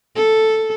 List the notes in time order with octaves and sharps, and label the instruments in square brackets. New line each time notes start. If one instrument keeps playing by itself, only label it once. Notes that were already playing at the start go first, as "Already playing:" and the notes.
[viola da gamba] A4